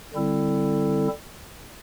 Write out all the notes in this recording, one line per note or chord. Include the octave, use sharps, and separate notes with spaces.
D3 G3 C4 E4 A4